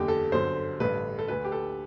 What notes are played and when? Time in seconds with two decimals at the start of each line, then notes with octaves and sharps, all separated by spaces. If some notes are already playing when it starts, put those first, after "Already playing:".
Already playing: F#1 E2 D3 G4
0.08 A4
0.32 G1 F#2 D3 C5
0.80 A1 G2 D3 B4
1.19 A4
1.28 D2 D3 B4
1.44 G4
1.52 A4